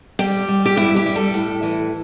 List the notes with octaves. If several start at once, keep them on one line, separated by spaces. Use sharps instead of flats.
G3 G4
G3
G4
G2 E4
G4
G3
A4
A2
E3